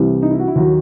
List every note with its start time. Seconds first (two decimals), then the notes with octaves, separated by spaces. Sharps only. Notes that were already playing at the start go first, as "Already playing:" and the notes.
Already playing: C2 C3 E3
0.22 D#4
0.31 E4
0.39 F#4
0.48 E4
0.55 D#2 D#3 F#3 F#4